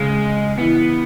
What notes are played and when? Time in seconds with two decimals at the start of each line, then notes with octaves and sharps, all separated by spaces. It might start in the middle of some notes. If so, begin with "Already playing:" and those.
Already playing: C#3 G#3
0.58 E3 B3